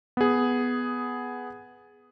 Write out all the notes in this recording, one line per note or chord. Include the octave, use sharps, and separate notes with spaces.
B3 G#4